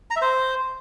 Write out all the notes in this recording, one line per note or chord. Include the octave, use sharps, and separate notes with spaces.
A#5
E5
C5